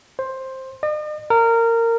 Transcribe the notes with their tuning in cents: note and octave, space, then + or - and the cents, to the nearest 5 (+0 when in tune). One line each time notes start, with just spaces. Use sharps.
C5 +10
D#5 -45
A#4 -20